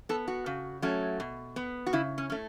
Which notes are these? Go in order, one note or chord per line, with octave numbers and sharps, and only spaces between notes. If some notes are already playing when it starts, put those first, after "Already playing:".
B3 A4
F#4
C#3
F#3 A3 C#4
B2
B3
F#4
C#3 E4
C#4
A3 C#4